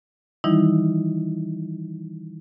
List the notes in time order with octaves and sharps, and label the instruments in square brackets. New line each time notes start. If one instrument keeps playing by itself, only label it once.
[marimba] D#3 E3 G3 D#4 E4